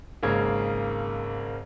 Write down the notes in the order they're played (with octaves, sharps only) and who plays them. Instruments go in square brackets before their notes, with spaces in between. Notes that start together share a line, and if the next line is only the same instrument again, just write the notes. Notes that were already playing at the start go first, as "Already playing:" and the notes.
[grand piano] G#1 C#3 A#3 G#6